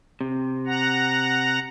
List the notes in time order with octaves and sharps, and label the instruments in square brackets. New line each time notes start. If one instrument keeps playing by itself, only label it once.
[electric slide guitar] C3
[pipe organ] F#5 A#5